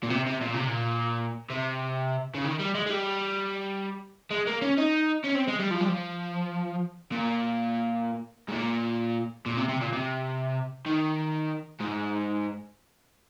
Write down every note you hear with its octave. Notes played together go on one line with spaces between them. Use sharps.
A#2
C3
C3
A#2
C3
A#2
C3
C#3
D#3
G3
G#3
G#3
G3
G#3
A#3
C#4
D#4
C#4
C4
G#3
G3
F3
G3
F3
A#2
G#2
A#2
A#2
C3
C3
A#2
C3
D#3
G#2